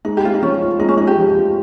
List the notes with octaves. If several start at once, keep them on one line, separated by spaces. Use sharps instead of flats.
G#3 D#4
G4
C4 F4
D#4
F3 C#4
F4
G#3 D#4
C#4
C4 D#4
G4
F3
F4